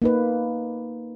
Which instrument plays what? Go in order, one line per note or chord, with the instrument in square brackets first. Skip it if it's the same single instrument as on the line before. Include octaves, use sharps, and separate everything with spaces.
[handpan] A#3 D#4 B4